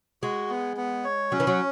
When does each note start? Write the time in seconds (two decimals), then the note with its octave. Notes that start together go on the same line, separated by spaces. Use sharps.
0.23 G#3 F#4
0.50 B3
0.77 B3
1.04 C#5
1.32 F#3 C#4
1.40 E3
1.47 F#3